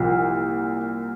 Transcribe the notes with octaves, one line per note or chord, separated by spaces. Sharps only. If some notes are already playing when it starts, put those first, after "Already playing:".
Already playing: C2 A#2 F3